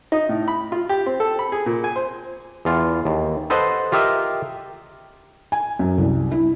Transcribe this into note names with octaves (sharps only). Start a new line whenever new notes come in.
D#4
A2
B5
F4
G4
C4
A4
B5
G#4
A#2
G#5
C5
E2 F4
D#2
A4 B4 C5 D#5 F#5
F4 G4 A#4 D#5 E5
G#5
F#2
C2
E4